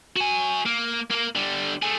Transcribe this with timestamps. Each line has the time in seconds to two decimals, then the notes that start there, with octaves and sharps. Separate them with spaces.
0.17 F#4 G#5
0.66 A#3
1.10 A#3 A#4
1.35 D3 G3
1.82 A3 G#4